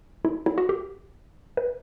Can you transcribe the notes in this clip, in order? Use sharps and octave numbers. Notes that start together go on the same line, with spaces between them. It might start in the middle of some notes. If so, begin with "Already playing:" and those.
E4
E4
F#4
G4
B4